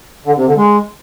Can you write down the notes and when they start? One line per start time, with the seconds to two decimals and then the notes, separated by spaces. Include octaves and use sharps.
0.25 D3
0.35 C3
0.46 D3
0.56 G#3